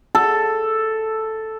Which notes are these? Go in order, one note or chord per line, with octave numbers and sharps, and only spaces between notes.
A4